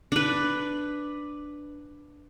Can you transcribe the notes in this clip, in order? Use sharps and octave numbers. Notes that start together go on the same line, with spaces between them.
D4 B4